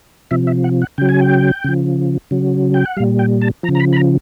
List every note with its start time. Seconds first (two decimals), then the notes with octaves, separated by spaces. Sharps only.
0.31 C3 F3 E5
0.47 E5
0.64 F#5
0.82 F#5
0.98 C#3 F#3 G5
1.09 G#5
1.21 G5
1.64 C#3 F3
2.31 C#3 F#3
2.74 G5
2.85 F#5
2.97 G3 F5
3.00 A#2
3.19 G5
3.42 A5
3.63 F3 A#5
3.69 C#3
3.75 A#5
3.80 B5
3.93 B5
3.96 A#5